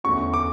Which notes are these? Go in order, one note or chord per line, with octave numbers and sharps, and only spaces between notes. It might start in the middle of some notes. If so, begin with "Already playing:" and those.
E2 D3 A3 C#4 F#4 C#6
D6